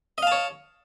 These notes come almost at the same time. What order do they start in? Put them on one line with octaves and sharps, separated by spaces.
D#5 F5 A5 C#5